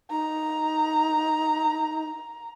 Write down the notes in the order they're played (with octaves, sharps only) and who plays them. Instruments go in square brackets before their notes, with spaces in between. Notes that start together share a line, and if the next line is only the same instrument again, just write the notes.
[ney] D#4 [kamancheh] A#5